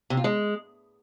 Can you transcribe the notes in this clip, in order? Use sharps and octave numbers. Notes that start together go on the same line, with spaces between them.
C3
F4
G#3